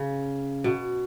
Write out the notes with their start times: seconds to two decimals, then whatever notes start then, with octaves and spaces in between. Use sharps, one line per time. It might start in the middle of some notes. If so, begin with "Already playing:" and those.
Already playing: C#3
0.64 B2